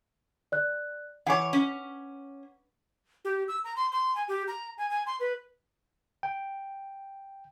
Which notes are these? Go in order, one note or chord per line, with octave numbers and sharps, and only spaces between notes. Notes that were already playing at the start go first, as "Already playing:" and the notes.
D5 F#6
E3 C#5 F#5 G#5 D6
C#4
G4
E6
A#5
C6
C6
G#5
G4
A#5
G#5
G#5
C6
B4
G5